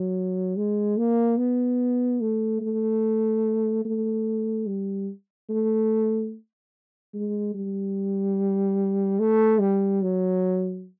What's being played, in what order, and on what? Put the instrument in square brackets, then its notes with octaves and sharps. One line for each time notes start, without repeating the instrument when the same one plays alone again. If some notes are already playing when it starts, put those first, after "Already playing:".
Already playing: [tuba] F#3
G#3
A#3
B3
A3
A3
A3
G3
A3
G#3
G3
A3
G3
F#3